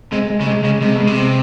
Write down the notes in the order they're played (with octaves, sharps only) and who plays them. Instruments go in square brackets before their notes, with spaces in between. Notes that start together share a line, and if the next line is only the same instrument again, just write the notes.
[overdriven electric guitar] C3 [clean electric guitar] G#3
[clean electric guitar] G#3
[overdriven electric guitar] C#3
[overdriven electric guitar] C3 [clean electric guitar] G#3
[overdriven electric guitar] C#3 [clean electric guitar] G#3
[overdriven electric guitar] C3 [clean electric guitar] G#3
[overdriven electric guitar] B2 [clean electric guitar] G#3
[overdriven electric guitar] C3
[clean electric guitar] C4